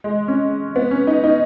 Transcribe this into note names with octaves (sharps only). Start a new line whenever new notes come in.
G#3
C#4
B3
C#4
D#4
D#4